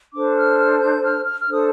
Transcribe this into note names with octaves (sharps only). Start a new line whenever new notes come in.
D4 A4 C5 D6
F6
F6
G6
F6
F6
F6
D4 A4 C5 D#6